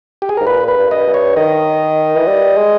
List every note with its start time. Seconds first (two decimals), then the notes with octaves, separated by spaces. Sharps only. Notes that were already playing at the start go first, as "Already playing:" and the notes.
0.22 G4
0.29 G#4
0.37 A#4
0.41 G#2
0.46 A#2 B4
0.68 B4
0.76 G2
0.91 D#5
1.07 G2
1.14 C#5
1.36 D#3 D#5
2.16 E3
2.27 G3
2.57 G#3